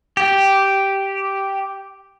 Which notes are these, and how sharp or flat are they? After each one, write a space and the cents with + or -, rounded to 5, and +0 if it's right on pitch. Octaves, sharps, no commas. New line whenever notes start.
G4 -5